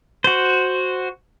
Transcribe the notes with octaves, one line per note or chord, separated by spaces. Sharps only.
F#4 C5